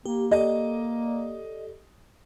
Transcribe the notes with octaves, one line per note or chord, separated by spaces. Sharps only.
A#3 G4
G4 A4 D5 D#5